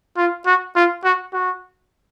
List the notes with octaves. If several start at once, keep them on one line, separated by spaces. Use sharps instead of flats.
F4
F#4
F4
F#4
F#4